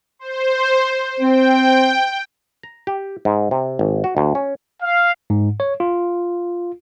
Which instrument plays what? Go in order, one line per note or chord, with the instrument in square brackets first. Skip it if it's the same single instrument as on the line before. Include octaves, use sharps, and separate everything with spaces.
[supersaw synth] C5
[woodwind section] C4 C5 [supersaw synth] G5
[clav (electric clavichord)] A#5
G4
G#2
C3
G#1
F#4
D2
C#4
[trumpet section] F5
[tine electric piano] G#2
C#5
F4